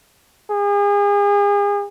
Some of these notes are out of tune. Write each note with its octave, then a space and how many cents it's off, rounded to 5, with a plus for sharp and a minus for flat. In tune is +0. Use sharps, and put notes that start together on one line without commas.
G#4 -35